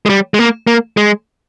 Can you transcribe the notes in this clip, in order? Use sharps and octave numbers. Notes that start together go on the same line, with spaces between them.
G#3
G3
G#3
A#3
A#3
G#3